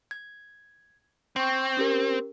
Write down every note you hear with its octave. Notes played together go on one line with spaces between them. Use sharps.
G#6
C4 G5 C#6
C#4 G4 A#4